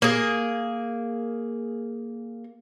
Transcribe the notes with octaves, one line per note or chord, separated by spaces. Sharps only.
A#3 G#4